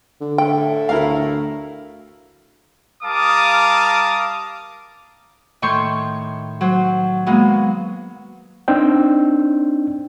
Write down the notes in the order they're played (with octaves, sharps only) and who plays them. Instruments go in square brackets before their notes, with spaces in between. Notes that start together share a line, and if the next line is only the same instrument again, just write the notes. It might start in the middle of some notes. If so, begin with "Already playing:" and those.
[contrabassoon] D3
[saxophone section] A2 A3 [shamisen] G5
[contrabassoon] D2 [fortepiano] E4 A#4 F5
[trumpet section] G3 A#4 F5 A5 D6 D#6
[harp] A2 D#3 C#5 C6 C#6 G6
F#3 C5
F#3 G#3 A#3 B3
[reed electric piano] C4 D4 D#4 G5